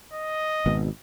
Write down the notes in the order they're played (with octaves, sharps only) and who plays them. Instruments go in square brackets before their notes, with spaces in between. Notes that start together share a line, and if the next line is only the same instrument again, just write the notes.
[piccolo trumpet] D#5
[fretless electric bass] G#1 B2